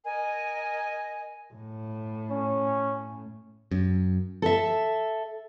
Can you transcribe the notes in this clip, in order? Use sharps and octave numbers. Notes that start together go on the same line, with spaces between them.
A#4 D#5 G#5
A2
C#4
F#2
A4 E5